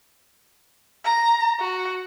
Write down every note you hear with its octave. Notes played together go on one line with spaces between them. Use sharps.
A#5
F#4